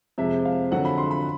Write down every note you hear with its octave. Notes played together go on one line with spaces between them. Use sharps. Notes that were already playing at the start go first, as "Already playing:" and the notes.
F2 C3 F3 G#3 E5
F5
F2 D3 F#3 F#5
B5
C6
B5